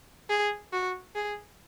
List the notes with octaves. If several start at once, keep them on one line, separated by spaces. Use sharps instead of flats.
G#4
F#4
G#4